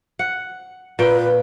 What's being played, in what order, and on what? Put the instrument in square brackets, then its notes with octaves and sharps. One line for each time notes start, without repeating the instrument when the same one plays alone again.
[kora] F#5
[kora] A#2 G5 [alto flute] B4